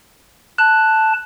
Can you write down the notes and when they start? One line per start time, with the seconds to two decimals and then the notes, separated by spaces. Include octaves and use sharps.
0.58 A5 F#6